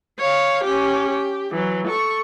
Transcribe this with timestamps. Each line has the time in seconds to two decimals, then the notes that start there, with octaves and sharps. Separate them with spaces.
0.20 C#5 F5
0.64 C#4 G4
1.10 G4
1.52 E3 F#3
1.87 A4 C#6